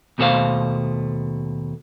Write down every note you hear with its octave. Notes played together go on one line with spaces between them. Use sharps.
D#2 B2 A3 G4 C5 F5